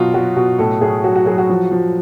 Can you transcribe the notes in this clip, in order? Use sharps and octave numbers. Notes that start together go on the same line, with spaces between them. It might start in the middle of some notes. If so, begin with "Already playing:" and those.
Already playing: B2 F#3 F4 F#4
F#3 F#4
B2 F#4
A2 A4
A2 G#4
F#3 F#4
F#4
F#3 G#4
F#4
F3
F3